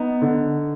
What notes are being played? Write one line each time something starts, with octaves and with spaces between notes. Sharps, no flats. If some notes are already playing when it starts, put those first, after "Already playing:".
Already playing: B3 D#4
D3